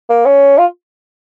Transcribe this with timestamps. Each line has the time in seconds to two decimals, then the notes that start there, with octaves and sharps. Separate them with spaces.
0.10 A#3
0.26 C#4
0.58 F4